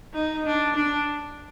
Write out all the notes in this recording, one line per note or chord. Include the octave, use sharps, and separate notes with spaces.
D#4
D4
D4